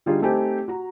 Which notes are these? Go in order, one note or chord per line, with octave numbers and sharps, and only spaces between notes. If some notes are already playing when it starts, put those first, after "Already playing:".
D3 G3 D#4 F4 G#4
A3 C4 D#4 G4 G#5
F#4 A#5